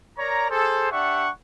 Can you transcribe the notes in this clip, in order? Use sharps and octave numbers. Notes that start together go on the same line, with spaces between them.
A#4 C#5 D5 A#5
G#4 A4 C5
D4 G4 D5 E5 F#5 C#6